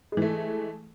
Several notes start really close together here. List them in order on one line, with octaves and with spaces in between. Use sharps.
G#3 E3 A3